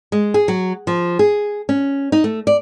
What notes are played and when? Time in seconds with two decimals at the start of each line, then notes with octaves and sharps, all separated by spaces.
0.12 G#3
0.34 G#4
0.48 F#3
0.87 F3
1.19 G#4
1.69 C#4
2.12 D#4
2.24 A3
2.47 D5